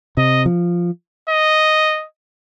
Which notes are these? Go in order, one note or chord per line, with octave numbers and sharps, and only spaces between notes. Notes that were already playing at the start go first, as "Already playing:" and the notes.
C3 D#5
F3
D#5